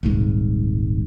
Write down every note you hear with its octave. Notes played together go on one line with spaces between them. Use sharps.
D#1 C2 G#2